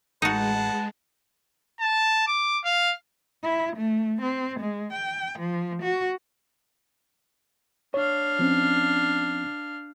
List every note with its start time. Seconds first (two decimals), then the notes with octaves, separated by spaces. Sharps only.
0.22 A1 G#3 D#4 F#4 B4 F#5 A5
1.80 A5
2.27 D6
2.64 F5
3.43 E4
3.76 A3
4.22 C4
4.60 G#3
4.93 G5
5.39 F3
5.82 F#4
7.94 D4 C#5 F5
8.39 F3 C4 C#4